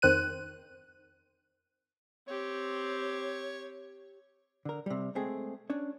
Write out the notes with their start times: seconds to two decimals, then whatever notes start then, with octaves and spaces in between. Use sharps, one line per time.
0.02 F2 D#3 C5 F#6 D#7
2.28 C4 G4 C#5
4.65 D3 A#4
4.86 C3 G3
5.15 G#3 A3 C4 G#4
5.70 C#4 D4 C#5